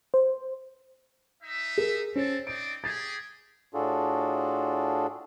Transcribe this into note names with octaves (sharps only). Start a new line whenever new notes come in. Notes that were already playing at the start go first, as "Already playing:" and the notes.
C5
D#4 E5
G#4 A#4
C4 C#4 A4 C5
C4 D#4 D5 D7
G4 G#4 A6
A2 D4 F4 F#4 G#4 A4